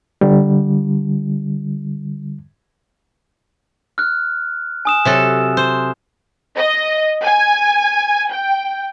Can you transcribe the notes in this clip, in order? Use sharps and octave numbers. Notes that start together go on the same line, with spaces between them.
D3 G3
F6 F#6
G#5 D#6 E7
C3 F#3 A4
C5
D#5
G#5
G5